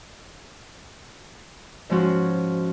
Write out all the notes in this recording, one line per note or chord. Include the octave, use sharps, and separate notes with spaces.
G#2 F3 G#3 C#4 F#4